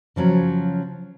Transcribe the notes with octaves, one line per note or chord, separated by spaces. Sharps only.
C#3 F3 F#3 C#4